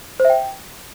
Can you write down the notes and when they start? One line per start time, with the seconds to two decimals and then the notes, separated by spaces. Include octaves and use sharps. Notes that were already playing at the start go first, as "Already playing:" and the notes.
0.20 C5
0.25 E5
0.30 G5